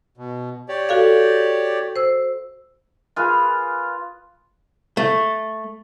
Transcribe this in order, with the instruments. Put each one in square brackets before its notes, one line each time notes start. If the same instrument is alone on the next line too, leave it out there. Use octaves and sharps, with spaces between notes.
[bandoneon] B2
G4 C#5 D5
[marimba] F#4 A4 F5
C5 E6
[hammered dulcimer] F4 G#4 B4 F5
[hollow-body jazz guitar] A3